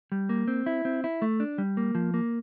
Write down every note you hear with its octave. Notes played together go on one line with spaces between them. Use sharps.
G3
A#3
C4
E4
C4
E4
A3
D4
G3
A#3
F3
A#3